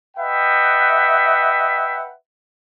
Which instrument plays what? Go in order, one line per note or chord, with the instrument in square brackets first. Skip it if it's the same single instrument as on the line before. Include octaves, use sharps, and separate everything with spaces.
[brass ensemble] B4 D#5 E5 F#5 G5